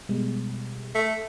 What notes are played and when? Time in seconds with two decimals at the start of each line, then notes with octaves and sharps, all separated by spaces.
0.09 B2 G3 G#3
0.94 A3